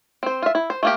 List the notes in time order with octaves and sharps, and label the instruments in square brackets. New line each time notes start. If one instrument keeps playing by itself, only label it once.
[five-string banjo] C4 C5
F4 E5
E4
C5
A3 A#3 G4